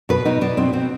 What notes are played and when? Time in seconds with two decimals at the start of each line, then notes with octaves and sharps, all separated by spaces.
0.09 B2 B4
0.25 B2 D#4
0.41 B2 D4
0.57 B2 C4
0.73 B2 C4